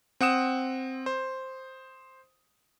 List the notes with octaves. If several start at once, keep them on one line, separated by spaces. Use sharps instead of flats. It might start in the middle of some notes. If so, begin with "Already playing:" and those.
C4 F#5 D#6 E7
C5